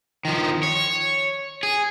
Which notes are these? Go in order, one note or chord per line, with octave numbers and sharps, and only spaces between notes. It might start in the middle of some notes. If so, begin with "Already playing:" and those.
D#3 F3
C#5
G#4